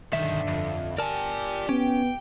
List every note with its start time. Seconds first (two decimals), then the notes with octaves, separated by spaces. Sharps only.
0.13 B1 G2 D3 D#3 E5
0.47 F2
0.98 G4 A#4 D5 G#5 A5
1.69 B3 C#4 G5